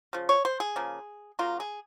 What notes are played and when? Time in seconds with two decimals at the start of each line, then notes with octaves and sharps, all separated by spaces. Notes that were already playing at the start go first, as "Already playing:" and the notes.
0.13 C#3 F3
0.29 C#5
0.45 C5
0.60 G#4
0.76 C#3 F3 A#3
1.39 C#3 F#3 A#3 F4
1.60 G#4